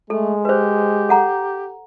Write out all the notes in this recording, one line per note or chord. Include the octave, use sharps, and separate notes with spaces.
G#3 A3 A4
G4 B4 C5
A4 F#5 A#5